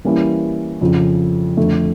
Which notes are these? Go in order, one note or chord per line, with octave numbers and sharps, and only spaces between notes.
E3 G3 A#3 C#4 E4
F2 C#3 F3
F2 D3 A3